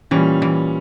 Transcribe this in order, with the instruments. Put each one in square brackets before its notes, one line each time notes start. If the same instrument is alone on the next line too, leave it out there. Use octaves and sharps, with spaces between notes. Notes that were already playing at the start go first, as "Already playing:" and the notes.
[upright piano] A#2 G3 C#4 [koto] E3
[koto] E3